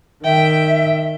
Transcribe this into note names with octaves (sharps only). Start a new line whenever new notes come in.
D#3 E5 G5